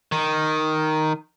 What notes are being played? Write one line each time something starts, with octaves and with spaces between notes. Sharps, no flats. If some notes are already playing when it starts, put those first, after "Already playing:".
D#3